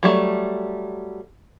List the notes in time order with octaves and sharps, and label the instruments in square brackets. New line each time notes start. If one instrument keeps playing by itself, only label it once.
[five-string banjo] F#3 G3 A3